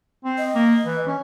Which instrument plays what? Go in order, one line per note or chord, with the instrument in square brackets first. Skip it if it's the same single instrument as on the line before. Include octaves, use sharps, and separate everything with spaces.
[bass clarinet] C4
[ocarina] D#5
[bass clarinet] A#3
E3
C#4